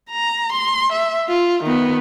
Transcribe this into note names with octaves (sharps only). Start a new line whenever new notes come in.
A#5
C6
E5
F4
D#3 B3